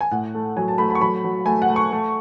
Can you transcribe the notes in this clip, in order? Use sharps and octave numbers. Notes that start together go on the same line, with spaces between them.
G#5
A2 F#5
A3
F#3 G#5
A5
A3 B5
B5
C#6
F#3 B5
F#3
A3 G#5
F#5
A3
C#6
A3